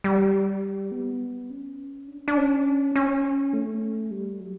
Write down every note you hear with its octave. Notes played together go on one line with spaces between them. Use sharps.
G3
B3
C#4
D4
C#4
D4
C#4
C#4
A3
G3
F#3